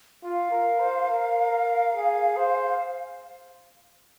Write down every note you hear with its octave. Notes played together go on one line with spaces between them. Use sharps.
F4 F5
A#4
C5
A#4
A#4
G#4
C5